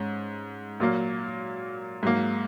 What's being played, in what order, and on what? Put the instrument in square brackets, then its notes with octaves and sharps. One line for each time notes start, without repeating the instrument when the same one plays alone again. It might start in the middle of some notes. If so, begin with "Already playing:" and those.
Already playing: [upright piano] G#2 C#4
A#2 F#3 A#3
G#2 F#3 A#3